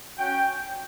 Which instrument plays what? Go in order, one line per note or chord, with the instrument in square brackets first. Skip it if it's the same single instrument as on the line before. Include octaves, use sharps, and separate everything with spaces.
[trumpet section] C#4 F#4 G5